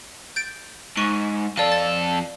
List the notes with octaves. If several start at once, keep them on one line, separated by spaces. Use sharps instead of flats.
G6 A6 D7
G#2 C#6
F2 A4 D5 F5
A6